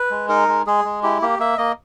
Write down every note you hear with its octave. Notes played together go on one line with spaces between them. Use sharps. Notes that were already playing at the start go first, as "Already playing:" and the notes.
Already playing: B4
G#3
D#4 A#4
G#3
G#3 G#4
G#3
E4 G4
A#3 G4
A#3 E5
A#3 D#5